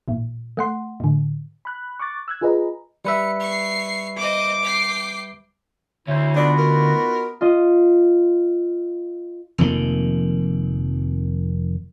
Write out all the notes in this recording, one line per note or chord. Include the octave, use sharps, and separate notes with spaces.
A1 A#2
A3 F#5 C6
A2 D3
B5 F#6
C#6 D6 F#6 A6
E6 F#6 G#6
F4 G#4 B4 D#5 A#5
G3 B4 E5 C#7
C#6 C7
C5 D#5 D6
G5 C7
D2 E4 C5 C#5
B3 D4 D#4 F4 F#4
A#4
F4 D#5
F1 F2 D#3 A#3